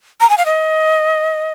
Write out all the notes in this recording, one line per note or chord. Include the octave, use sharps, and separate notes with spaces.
A#5
G#5
F5
D#5